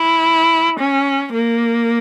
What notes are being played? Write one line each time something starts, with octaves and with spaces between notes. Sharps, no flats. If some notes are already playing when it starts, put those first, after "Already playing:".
Already playing: E4
C#4
A#3